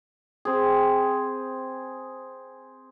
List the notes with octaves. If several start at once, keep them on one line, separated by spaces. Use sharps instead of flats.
C4 G#4